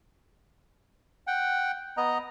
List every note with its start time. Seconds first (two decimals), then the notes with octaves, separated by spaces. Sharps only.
1.27 F#5 G5
1.97 B3 D#5 A#5